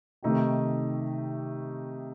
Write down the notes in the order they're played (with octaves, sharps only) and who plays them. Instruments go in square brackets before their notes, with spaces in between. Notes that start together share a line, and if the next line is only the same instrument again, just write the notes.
[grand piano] C3 D#3 A3 D#4 G4